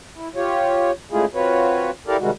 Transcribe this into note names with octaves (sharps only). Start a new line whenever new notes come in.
E4
F4 G4 C#5
C#3 G#3 A3 E4 F4 G#4
C4 F4 F#4 B4 C#5
E4 G4 A4 A#4 D5 F5
C3 D#3 G3 G#3 F#4